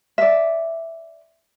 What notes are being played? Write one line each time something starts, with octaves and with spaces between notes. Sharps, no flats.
D5 E5